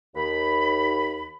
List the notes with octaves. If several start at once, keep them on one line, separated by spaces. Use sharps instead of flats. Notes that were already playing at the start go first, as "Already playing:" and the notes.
D#2 B5